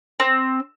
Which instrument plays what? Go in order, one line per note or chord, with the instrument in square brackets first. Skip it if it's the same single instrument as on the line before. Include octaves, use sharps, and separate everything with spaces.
[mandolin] C4